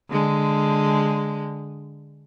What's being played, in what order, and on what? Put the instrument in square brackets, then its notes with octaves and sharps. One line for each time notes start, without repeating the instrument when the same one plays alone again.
[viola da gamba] D3 G#3